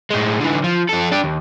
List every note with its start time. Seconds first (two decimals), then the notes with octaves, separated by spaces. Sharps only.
0.11 A2 G#3
0.40 D3 E3
0.64 F3
0.89 F3 A4
1.12 D4 G4
1.24 D#2